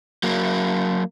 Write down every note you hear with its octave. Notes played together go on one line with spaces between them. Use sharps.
F#3 A#3